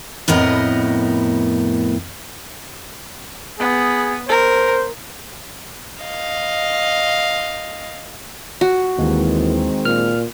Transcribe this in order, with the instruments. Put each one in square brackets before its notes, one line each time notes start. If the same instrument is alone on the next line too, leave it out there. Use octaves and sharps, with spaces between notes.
[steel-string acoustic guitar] F2 A2 B3 A#4 D#5
[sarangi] B3 [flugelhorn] G#4
[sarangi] A#4 [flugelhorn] C5
[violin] D#5 F5
[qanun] F#4
[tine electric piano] D#2 [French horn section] D#3 G#3 C4 [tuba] E3
[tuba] A#2 [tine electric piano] F6